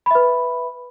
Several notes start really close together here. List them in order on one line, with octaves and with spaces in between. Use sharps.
B5 E5 B4